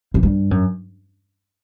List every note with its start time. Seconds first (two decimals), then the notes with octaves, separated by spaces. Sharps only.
0.14 F#2
0.23 G2
0.51 F#2